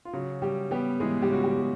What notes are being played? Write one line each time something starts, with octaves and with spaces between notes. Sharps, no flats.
F4
C#3 F#3 F#4
G3 G4
G3 B3 G4
E3 G#3 G#4
G3 G4
C#3 F#4
G3 G4
G3